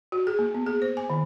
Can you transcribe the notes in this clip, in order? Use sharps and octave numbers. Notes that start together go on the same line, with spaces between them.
F#4
G#4
A#3
B3
G#4
C5
G#5
D#3